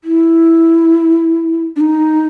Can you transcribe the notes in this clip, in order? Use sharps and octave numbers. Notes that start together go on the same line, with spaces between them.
E4
D4
D#4